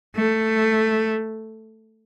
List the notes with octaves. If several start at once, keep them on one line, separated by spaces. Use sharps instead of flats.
A3